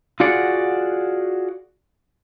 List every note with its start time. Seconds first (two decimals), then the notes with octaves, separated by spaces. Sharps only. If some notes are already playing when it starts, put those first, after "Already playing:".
0.20 F4 F#4 G#4 D5 F#5